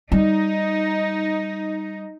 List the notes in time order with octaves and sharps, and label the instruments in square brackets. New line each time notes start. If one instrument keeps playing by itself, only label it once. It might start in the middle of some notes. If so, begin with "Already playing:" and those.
[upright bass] G3 [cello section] D#4